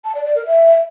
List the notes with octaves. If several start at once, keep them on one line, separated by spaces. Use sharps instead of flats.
A5
D5
D5
A#4
E5